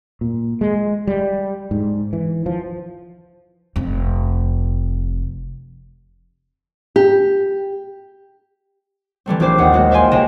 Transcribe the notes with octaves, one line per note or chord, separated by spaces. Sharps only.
A#2
G#3
G3
G#2
E3
F3
F1 F2
G4
E3 G3 A3 C4
A#1 E4 G4 C5 D6 C7
D#2 F#5 D#6
G#3 A#3 F#4
C5 E5 F5 G5 G#5 C6
C#2 C3 D#5 G5 E7